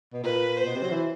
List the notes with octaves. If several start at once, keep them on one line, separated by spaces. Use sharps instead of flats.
B2
A#2 B4
C5
B2
C3
F#3
E3